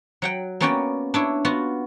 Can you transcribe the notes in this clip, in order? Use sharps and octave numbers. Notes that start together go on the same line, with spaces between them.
F#3 F#5 G5
A#3 B3 C#4 F#4 D5 G5
D4 E4 C#5
B3 F4 F#4